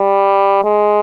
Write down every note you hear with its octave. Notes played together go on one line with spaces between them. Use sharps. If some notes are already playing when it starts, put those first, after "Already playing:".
Already playing: G3
G#3